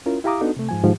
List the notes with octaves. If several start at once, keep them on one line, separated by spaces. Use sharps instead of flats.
C#4 E4 F4 A#4
E4 G4 F5 A#5 D6 D#6
B3 D4 D#4 F#4 A4
C3 A3
G#2 F3 G#5
G#2 D#3 F3 G4